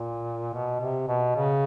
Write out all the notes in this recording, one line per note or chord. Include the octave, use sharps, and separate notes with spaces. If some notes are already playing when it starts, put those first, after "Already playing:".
Already playing: A#2
B2
C3
B2
C#3